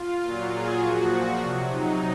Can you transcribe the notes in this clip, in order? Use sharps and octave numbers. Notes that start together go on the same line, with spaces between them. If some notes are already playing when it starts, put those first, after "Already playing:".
Already playing: F4
A#2 F#3
G#4
A#2 F3 F#4
C3 F#3
D#4